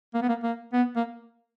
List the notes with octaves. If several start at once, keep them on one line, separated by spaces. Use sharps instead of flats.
A#3
B3
A#3
A#3
B3
A#3